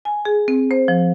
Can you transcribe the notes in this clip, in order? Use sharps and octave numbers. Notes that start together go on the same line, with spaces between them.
G#5
G#4
C4
C5
F3